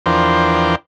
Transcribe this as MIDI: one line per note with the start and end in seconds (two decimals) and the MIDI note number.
0.06 0.75 40
0.06 0.75 53
0.06 0.75 62
0.06 0.75 70
0.06 0.75 72
0.06 0.75 79